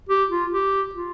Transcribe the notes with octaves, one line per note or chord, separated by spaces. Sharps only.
G4
F4
G4
F4